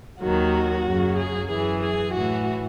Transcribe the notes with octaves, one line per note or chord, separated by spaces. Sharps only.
D#2 D#3 F#3 F#4
F#2 C#3 F#3
G#4
F#2 E3 G#4
G#4
A2 E3 F#4